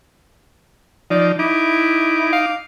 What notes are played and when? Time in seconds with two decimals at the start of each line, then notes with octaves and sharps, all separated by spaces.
1.10 F3 D#4 D5
1.39 D#4 E4 D6
2.32 F5